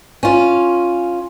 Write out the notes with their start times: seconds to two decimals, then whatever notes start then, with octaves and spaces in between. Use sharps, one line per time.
0.23 C#4 F4